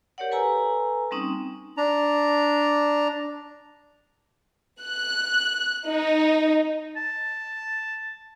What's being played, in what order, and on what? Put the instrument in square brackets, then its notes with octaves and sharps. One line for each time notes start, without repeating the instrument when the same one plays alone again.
[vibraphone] G4 A#4 C#5 D5 F#5
A4 B4 G#5 A#5 E6
G3 A#3 C4 C#4 D#4
[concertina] D4 A#5
[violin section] F#6
D#4
[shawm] A5